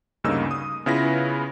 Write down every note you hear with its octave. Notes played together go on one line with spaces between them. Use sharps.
D2 G2 C#3 A#3 D#4 E6
D#6
C#3 B3 E4 F4 B4 A#6